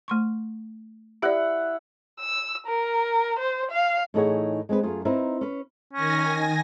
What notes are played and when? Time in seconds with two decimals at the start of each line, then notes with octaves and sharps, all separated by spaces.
0.08 A3 C6 C#6
1.22 E4 G4 D5 F#5
2.21 E6
2.67 A#4
3.39 C5
3.72 F5
4.14 A2 E3 D#4 G#4 C#5 F#5
4.69 G#3 C4 G#4 B4
4.83 F#2 A3 F4 G#4
5.05 C4 D#4 E4 A#4 B4
5.41 C#4 B4
5.93 D#3 C#4 G#5 A#6